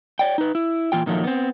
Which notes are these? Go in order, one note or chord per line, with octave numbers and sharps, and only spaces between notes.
C#5 D5 G5
D#4 B4
E4
A#2 E3 F4 G5
A#2 D#3 F3 F#3 A3
B3 C4